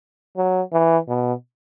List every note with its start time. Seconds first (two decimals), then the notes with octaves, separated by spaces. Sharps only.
0.37 F#3
0.73 E3
1.08 B2